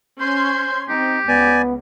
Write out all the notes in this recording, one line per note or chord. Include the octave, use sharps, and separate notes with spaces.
C#4 C5 C6 G#6
C4 D#4 G4
C#2 B3 D5 G#5